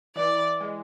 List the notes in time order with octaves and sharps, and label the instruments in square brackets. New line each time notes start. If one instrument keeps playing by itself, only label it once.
[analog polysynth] E3 [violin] D5
[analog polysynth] G#3